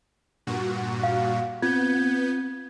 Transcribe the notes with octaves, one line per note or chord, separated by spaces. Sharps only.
G2 A#2 F#4
F5
B3 C4 F4 G6 G#6